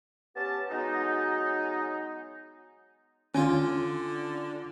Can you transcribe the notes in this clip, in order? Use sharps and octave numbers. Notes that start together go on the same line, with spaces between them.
B3 C#4 G4 A5
F#3 G#3 B3 D#4
D3 C#4 F4 G5 G#5